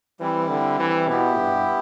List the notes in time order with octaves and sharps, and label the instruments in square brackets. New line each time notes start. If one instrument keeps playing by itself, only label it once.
[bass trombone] E3 [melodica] G3 C4 E4
[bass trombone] D3
E3
[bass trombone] B2 [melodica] B3 E4 G4
[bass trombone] G2